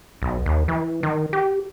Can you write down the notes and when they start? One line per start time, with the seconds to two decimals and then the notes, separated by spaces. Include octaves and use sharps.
0.22 B1
0.46 D#2
0.68 E3
1.03 D#3
1.33 G4